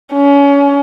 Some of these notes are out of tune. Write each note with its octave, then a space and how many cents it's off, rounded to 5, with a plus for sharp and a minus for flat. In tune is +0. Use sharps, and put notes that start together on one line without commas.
C#4 +30